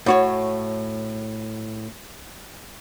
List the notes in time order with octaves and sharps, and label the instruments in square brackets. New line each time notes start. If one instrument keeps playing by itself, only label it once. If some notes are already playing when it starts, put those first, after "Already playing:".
[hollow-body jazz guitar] A2 F#4 C#5